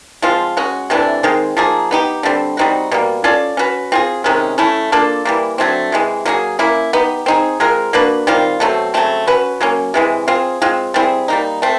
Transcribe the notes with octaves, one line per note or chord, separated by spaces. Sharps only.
F3 G#3 C4 F4
G#3 C#4 F#4
C3 E3 A3 D4
D#3 G#3 C4
F3 A#3 D#4 G#4
B3 D#4 G4
D3 G3 C4
G3 C4 D#4 F#4
B2 G3 A#3
C#4 F4 A4 D5
C#4 F#4 B4
C4 F4 G#4
C3 D#3 G#3 C#4
A3 C#4 E4
A#3 D4 F4 A4
E3 G3 A#3
D3 F#3 A3 C4
C3 E3 G#3
F#3 A#3 D#4 G#4
A#3 C#4 E4
B3 D#4 G4
C4 D#4 G#4
G#3 C4 F4 A#4
A#3 D4 F#4 B4
D#3 G3 C4 F4
B2 F#3 A3 C4
C#3 F#3 A3 C4
C#4 F#4 B4
F#3 A#3 C#4
C3 E3 G#3
C4 F4 G#4
G#3 C4 F4
G3 C4 E4 G#4
G3 A#3 D#4
A3 C4